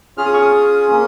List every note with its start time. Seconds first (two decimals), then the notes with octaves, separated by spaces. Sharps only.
0.17 C#4 F4 G#4 F6
0.26 D#6
0.34 C#6
0.42 D#6
0.91 A#3 C#4